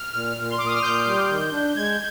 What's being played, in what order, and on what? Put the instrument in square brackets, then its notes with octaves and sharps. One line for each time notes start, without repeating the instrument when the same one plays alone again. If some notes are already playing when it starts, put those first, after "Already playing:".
Already playing: [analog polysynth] F6
[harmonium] A#2 [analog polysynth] F6
[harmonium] A#2
[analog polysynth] C6
[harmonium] A#2 [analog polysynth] D6
[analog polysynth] D#6
F6
[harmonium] A#2 [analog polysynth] G6
[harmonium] G3
D#3
D4
[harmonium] G#3 [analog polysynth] G#6